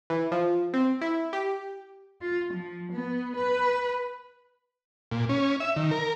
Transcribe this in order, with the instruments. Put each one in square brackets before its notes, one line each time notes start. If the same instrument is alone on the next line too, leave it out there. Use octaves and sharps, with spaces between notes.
[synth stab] E3
F3
C4
E4
G4
[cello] F4
F3
B3
B4
[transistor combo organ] A#2
C#4
E5
D#3
A#4